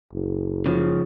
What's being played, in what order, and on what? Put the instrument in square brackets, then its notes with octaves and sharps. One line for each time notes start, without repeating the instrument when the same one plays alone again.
[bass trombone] F#1
[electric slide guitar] C#3 F3